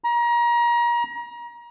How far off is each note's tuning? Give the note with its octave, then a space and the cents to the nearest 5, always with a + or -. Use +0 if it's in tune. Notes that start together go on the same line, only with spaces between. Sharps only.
A#5 +30